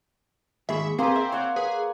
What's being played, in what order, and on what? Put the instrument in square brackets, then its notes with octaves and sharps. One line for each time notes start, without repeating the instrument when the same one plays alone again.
[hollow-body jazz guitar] D#2 G#2 G#4 [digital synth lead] E5 [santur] B5 C#6
[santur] A#3 C5 G#5 [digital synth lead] C4 [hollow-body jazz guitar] G#4 B4
[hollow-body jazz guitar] E5
[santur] C#5 F#5
[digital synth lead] G#4 [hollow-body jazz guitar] B4